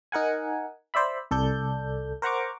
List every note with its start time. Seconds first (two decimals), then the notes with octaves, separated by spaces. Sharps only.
0.12 D#4 A#4 F#5 G#5
0.94 C5 D5 E5 B5
1.31 C2 A4 D5 G6
2.22 A#4 C5 F#5 A#5 C#6 D6